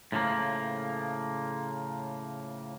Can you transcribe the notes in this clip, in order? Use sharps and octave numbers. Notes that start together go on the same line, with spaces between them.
A2 C#3 F3 G3 A#3